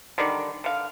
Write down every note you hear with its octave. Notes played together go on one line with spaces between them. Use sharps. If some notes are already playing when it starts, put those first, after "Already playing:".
D3 D#3 G3 D5
D3 F5